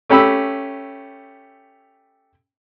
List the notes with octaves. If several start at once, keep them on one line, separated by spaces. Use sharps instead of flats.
A3 C#4 G4 B5 E6